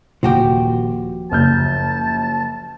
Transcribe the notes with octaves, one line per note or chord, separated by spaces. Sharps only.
D#1 F3 F#4 G4
F#1 A5 F6 G6